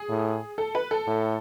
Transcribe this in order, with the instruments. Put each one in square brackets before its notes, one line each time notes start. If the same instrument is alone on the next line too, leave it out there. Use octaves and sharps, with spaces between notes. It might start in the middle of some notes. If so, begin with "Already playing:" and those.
Already playing: [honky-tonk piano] G#4
[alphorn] A2
[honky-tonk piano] A4
B4
A4
[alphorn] A2